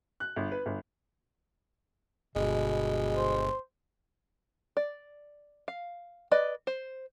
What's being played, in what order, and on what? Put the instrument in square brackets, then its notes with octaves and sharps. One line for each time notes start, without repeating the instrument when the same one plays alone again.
[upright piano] F#6
G1
B4
G1
[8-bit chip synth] G1 [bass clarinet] B2 [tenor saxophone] G#3
[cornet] C5
[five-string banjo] D5
F5
B4 D5 D#5
C5